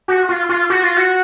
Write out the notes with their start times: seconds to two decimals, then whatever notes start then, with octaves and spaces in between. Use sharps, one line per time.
0.08 F#4
0.29 F4
0.49 F4
0.70 F#4
0.83 F4
0.97 F#4